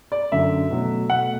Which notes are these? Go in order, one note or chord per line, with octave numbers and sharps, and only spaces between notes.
D5
F#2 D3 F#3 E5
B2 F#3 A3
B2 A3 F#5